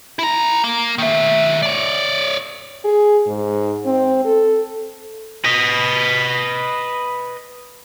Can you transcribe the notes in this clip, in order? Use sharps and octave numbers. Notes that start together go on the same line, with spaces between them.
E4 A#5
A#3
D#3 E5
C#5 D5
G#4
G#2
C4
A4
B4 D#5